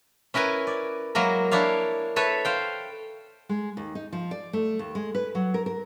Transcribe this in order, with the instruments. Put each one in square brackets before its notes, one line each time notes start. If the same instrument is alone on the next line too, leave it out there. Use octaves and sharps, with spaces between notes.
[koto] C#4 E4 A#4 B4 G#5
D5
F#3 G#3 A#3 E4 A#4
D4 E4 C#5 D5 F5
A4 B4 C#5 E5
C5 F5 G5
[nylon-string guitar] G#3
D#2
D#4
F3
D5
A3
D#2
G#3
B4
F#3
A#4
A#4